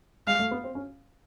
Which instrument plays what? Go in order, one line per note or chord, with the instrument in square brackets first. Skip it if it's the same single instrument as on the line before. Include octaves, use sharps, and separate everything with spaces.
[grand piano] G#3 [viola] F5
[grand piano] A3
B3
C4
C#4